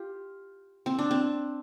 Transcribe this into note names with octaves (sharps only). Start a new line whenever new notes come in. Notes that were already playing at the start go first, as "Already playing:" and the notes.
Already playing: F4 G4
C4
D4
C4